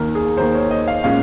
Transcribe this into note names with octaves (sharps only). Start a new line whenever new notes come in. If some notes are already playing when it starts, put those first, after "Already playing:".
Already playing: D#2 D#3 A#3 A#4
G#4
D#2 D#3 A#3 C5
C#5
D#5
F5
A#2 G#3 C#4 F5